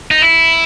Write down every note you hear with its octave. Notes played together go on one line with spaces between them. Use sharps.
D#4
E4